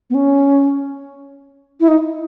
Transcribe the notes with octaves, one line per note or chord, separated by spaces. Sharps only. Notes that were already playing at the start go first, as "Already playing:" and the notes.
B3
C#4
E4
D#4